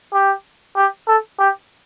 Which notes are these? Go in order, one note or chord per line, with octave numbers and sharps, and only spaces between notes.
G4
G4
A4
G4